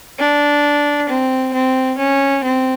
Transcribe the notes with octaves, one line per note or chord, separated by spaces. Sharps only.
D4
C4
C4
C#4
C4